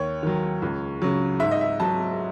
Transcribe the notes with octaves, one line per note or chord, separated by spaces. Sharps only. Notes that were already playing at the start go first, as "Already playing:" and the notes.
Already playing: D#2 C#5
D#3 F#3
C#2
C#3 F#3
G#2 E5
D#5
E5
F#3 A5